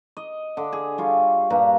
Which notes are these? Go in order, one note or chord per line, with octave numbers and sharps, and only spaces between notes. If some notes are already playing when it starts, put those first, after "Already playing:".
D#5
D3
G#4
G3 F4 C#5
G2 A#2 A#5